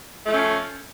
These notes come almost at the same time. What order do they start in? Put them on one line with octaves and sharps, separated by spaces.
A3 F3 C#4